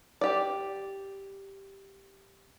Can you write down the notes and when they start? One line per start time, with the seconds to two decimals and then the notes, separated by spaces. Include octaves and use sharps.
0.21 G4 D5